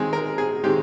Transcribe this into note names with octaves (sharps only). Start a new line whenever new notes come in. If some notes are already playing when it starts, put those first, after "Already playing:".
Already playing: D#3 G#3 C4 G#4
A#4
G#4
D#3 G#3 C4 G4